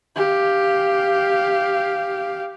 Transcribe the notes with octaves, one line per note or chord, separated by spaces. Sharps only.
G4 F5